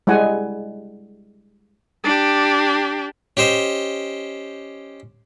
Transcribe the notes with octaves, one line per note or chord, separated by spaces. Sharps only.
G3 G#3 E4 F#5 G#5
D4 G4
C#4 G4 C5 D#5